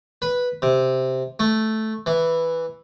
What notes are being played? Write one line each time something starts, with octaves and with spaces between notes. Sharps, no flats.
B4
C3
A3
E3